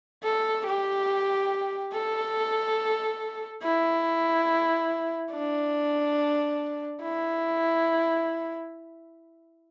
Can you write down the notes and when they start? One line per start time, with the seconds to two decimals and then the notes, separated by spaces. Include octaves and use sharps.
0.24 A4
0.66 G4
1.93 A4
3.62 E4
5.32 D4
7.01 E4